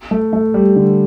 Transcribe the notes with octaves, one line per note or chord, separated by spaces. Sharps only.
A3
A3
G3
D3